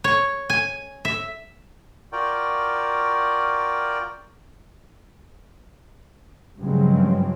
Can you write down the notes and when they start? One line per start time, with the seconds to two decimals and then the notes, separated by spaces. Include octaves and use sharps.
0.04 C#5
0.49 G#5
1.05 E5
2.12 F4 F#4 A#4 D5 G5
6.59 G2 C#3 F3 F#3 G#3 C4